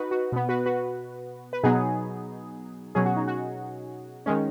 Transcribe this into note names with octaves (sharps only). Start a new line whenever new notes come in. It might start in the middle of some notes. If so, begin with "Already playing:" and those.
Already playing: D#4 F#4 B4
F#4
B2 B3
F#4 B4
F#4 B4
B4
B2 F#3 B3 D#4 G#4
B2 F#3 C#4 G#4
F#4
D#4
F#4
D#3 G#3 C#4